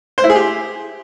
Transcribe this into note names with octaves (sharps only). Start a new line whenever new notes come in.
C5
E4
G#4
G4